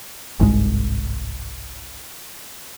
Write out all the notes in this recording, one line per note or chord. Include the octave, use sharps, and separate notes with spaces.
G1 C2 G#2 G#3